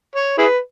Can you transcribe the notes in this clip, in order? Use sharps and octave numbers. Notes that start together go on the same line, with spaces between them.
C#5
E4 G#4 B4